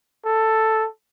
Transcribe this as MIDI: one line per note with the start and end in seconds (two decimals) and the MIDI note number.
0.25 0.87 69